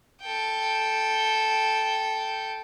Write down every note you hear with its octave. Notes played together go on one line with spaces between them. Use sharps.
A4 G5